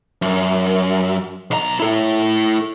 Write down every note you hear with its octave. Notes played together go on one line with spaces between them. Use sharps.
F#2
B1 A#5
E4 A4